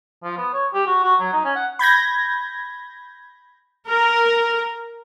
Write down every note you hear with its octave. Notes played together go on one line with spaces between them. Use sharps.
F3
B3
C#5
G4
F#4
F#4
F#3
D#4
C#4
F#5
B5 G6 G#6 A#6
A#4